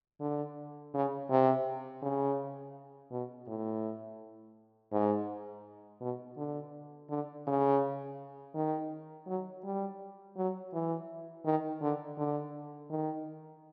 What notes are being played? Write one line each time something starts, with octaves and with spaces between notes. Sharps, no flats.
D3
C#3
C3
C#3
B2
A2
G#2
B2
D3
D3
C#3
D#3
F#3
G3
F#3
E3
D#3
D3
D3
D#3